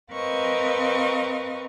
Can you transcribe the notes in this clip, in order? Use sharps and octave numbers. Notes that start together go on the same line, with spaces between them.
C4 A#4 B4 D#5 F5 C#6